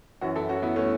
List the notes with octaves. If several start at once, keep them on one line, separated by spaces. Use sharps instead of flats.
F#2 E3 C#4 F#4
E4 A4
C#4 F#4
B3 E4
A3 C#4